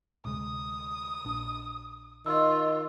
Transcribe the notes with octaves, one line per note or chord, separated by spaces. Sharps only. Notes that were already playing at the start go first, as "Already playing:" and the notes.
D2 C3 G#3 D#6
A#1 D4
D#3 F4 D#5 E6